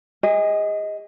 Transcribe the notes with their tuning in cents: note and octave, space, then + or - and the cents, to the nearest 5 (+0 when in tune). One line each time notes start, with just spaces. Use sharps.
G#4 -35 D#5 +15